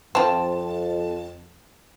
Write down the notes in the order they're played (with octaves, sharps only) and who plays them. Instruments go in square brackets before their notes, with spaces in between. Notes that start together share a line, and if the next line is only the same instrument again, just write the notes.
[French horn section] F2 [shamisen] F3 C4 [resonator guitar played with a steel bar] A5